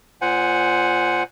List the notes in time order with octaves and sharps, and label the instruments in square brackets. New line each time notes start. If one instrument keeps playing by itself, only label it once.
[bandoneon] A#2 C5 F#5 G#5